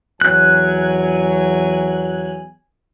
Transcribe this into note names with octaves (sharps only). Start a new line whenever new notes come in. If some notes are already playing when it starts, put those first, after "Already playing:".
E2 F#3 G#5 F#6